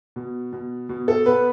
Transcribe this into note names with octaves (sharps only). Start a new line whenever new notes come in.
B2
B2
B2
A4
B3 B4